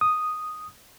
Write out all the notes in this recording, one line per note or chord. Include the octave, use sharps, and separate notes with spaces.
D#6